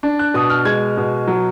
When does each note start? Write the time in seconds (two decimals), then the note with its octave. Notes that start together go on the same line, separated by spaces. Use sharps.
0.03 D4
0.19 F#6
0.34 B2 D#6
0.50 F6
0.65 G#3 G#6
0.97 B2
1.28 F#3